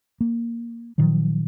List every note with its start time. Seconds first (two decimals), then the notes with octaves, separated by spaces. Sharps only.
0.21 A#3
0.98 A#2 D#3 F3 F#3